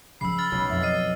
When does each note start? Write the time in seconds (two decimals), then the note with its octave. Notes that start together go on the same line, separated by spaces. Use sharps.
0.21 C#3 F3 B5 E6 C7
0.38 F6 A6
0.52 B1 C#4
0.69 F2 E5
0.82 D#5 F6 C7 D#7